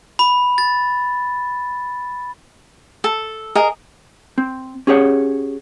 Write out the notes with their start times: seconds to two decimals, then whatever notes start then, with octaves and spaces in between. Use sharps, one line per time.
0.19 B5
0.58 A6
3.04 A4
3.55 G#4 A#4 D#5
4.38 C4
4.87 C#4 G4 G#4 C#5 F#5